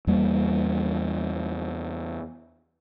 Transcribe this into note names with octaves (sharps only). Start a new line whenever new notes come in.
E2 G3 A#3